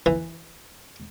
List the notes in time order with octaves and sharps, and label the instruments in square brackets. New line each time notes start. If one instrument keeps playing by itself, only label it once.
[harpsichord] E3